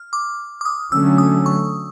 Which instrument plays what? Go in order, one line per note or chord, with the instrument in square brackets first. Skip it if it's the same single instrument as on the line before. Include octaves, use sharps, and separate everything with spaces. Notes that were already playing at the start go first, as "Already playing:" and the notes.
Already playing: [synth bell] F6
D6
D6
D#6
[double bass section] D3 F#3 A3 C#4 [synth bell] E6
[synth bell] D#6
C#6